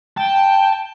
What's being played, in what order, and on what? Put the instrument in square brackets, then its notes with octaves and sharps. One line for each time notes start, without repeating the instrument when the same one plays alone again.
[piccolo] G5 [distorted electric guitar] A5